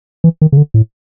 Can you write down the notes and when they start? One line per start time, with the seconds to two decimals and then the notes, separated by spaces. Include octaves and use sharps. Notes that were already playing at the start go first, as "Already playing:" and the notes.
0.24 E3
0.42 D#3
0.52 C#3
0.57 D3
0.74 A2